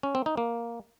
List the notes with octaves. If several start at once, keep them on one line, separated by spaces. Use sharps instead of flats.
C#4
C4
D#4
A#3